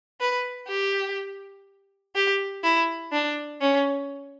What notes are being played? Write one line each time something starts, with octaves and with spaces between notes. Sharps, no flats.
B4
G4
G4
E4
D4
C#4